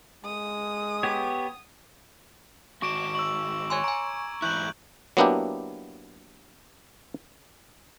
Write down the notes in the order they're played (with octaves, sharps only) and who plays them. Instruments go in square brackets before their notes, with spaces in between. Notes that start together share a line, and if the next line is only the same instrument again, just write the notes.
[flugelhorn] G#3 [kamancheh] D#6
[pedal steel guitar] B3 G4 C#5
[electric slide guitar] G#2 D#3 F#4 [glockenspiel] C#6 [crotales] D6 D7 E7
[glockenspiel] C#6 E6 [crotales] F#7
[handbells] C#5 G#5 C6 [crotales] C#6 G#6
[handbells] G#5 C#6 [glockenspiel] A#5 [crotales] D7
[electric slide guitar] G#2 E3 E4 [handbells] C#6 [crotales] F#6 G6 F#7
[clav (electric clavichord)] F#3 A#3 B3 D4 E4 G4